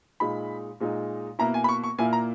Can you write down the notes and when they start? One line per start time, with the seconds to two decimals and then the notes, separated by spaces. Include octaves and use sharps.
0.20 A#2 G#3 D#4 B5
0.80 A#2 G#3 D#4
1.39 B2 A#3 E4 A#5
1.54 G#5
1.64 B5
1.69 C#6
1.84 C#6
1.98 A#2 A#3 E4 G#5
2.13 A#5